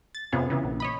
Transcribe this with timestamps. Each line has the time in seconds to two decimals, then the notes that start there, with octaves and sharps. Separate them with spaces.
0.15 A6
0.32 F2 C3 B3 C#4 F4 G#4
0.50 C#3 E3 B3
0.64 A#1
0.80 C#5 D#5 B5